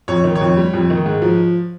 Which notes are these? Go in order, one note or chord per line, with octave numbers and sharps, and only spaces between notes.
F2 C#5
D#3
C#5
F2
G3
F2
D#3
G#2
F3